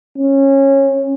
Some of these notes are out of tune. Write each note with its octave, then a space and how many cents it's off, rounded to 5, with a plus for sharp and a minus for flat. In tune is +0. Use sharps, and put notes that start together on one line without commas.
C#4 -20